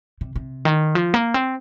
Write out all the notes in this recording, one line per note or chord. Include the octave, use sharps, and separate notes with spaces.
C3
C3
D#3
F3
A#3
C4